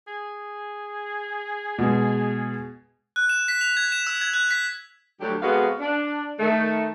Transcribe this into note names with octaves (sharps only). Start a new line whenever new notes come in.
G#4
B2 G#3
F#6
E7
B6
F7
G#6
E7
E6
G#6
F#6
B6
D2 D3 F#3 G3 G4
C3 G#3 B3 F#4 A4 F5
D4
D#3 A3